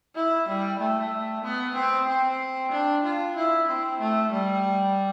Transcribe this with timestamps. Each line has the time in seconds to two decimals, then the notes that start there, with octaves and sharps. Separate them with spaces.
0.15 E4
0.48 G3
0.79 A3
1.44 B3
1.76 C4
2.07 C4
2.72 D4
3.04 F4
3.36 E4
3.68 C4
4.01 A3
4.32 G3